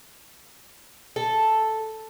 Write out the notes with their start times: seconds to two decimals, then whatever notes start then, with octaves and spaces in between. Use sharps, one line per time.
1.16 A4